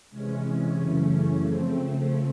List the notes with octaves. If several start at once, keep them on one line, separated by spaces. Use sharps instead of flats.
C3 E3 G#3 C#4
F#2 C#3 E3 A3 C#4
C#3 F3 A3 C4